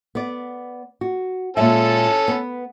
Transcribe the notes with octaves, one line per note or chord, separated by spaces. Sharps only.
B3 D5
F#4
A#2 G#3 C#4 A4 E5 A5
B3 B4